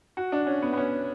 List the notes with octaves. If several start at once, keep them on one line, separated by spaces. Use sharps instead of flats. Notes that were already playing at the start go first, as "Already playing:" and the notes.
F#4
D4
C#4
B3
B3
C#4